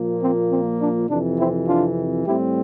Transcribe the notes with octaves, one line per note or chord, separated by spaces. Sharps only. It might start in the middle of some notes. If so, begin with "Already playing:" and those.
Already playing: A#2 F3 A#3
C4
C4
D4
F2 C3 E3 D4
C4 E4
D4 F4
A2 G3 C4 E4 G4